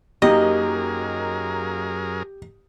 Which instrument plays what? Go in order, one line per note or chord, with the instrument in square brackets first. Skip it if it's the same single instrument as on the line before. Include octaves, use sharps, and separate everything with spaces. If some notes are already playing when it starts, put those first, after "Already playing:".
[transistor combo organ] F#2 G#4 A#4 [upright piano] F#3 A#3 D#4 [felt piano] G4 [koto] D#5